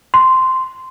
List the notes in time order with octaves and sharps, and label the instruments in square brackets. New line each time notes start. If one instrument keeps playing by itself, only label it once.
[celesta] C6